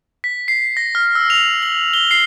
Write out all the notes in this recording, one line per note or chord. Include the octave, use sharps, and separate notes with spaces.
B6
C7
A#6
F6
E6
F7
F#7
G7
C7